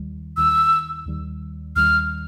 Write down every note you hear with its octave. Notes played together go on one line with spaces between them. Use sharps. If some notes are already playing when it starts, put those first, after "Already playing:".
Already playing: D#2 D#3 G3
D#2 D#3 G3 E6
D#2 D#3 G3
D#2 D#3 G3 F6